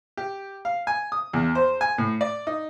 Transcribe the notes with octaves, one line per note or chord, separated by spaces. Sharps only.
G4
F5
G#5
D#6
E2
C5
G#5
A2
D5
D#4